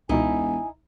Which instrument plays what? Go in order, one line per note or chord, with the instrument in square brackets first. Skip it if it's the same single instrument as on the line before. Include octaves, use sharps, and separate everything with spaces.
[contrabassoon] E1 [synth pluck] C#2 B2 [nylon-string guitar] D#4 E4 [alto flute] G#5